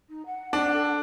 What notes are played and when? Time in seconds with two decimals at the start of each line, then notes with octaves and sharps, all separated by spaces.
0.09 D#4
0.25 F#5
0.53 D4
0.73 A4